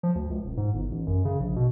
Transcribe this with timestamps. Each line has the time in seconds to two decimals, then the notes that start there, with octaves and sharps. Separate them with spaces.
0.03 F3
0.15 D2
0.30 C#2
0.45 D#1
0.57 G#2
0.74 G1
0.91 A1
1.07 F#2
1.25 C#3
1.40 A#1
1.56 B2